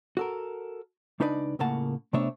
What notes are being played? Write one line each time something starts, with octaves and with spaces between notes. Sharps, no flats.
F#4 A4 A#4
C#2 D4 D#4 B4 C5 D5
C#2 A2 C#3 A#3 F#5 A5
C3 A3 B3 D4 C#5 E5